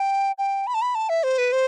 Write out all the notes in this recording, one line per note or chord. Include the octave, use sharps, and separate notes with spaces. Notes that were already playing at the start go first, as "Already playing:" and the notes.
Already playing: G5
G5
B5
A5
B5
A5
E5
C5
B4
C5